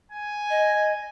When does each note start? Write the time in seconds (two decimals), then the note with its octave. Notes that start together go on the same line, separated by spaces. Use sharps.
0.12 G#5
0.50 D#5